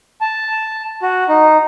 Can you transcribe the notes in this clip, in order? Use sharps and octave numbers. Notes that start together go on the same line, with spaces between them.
A5
F#4
D#4